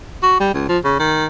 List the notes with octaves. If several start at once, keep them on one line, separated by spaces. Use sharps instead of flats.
F#4
G3
C#2
F3
C#3
D#3